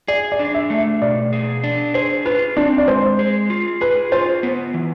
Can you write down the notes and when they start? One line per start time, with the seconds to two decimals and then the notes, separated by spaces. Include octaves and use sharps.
0.08 G#4 D5
0.32 D5
0.39 D4
0.54 E5
0.70 A3
0.78 E5
1.01 B2 D5
1.33 G#4
1.64 D4
1.94 G#4 C5
2.26 F4 B4
2.57 C4 D4
2.78 D5
2.88 G#3 C5
3.19 G#4
3.50 F4
3.81 G#4 B4
4.12 F4 C5
4.43 B3
4.74 E3